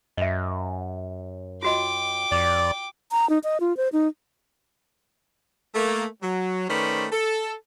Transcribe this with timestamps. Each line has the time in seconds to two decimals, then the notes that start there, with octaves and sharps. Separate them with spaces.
0.17 F#2 D#5 E5
1.63 F4 F#4 D#5 G5 D6
2.31 F2 D5
3.12 A#5
3.30 D#4
3.44 D#5
3.60 F4
3.77 C5
3.93 D#4
5.74 A3 A#3
6.22 F#3
6.68 D#3 A3 C#4 B4 C5 D5
7.12 A4